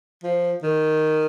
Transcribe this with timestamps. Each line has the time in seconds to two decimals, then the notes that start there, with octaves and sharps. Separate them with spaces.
0.23 F3
0.63 D#3